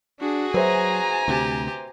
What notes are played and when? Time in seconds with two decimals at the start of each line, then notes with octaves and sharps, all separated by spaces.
0.20 D4 F#4 G#4
0.54 F#3 B4 C5 E5 G#5 A#5
1.28 D2 C3 G4